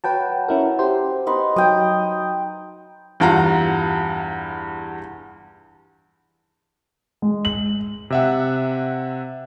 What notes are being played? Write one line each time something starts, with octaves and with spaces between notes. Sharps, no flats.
F#3 B4 G5 A5
C#4 E4 A#4
G4 C5
D#4 B4 C6
F#3 G5 D#6
E2 G2 F4 F#5 A#5 A#6
G#3
F#7
C3 E5 F#5